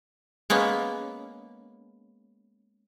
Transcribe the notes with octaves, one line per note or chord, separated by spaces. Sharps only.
G#3 A#3 B3 C#4